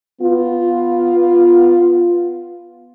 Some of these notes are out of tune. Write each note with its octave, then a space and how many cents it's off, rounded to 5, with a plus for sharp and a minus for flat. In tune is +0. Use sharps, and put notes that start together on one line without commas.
B3 +0 F4 +0